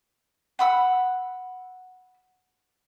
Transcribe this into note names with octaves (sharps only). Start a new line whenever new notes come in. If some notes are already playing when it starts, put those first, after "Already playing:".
F#5 B5 E6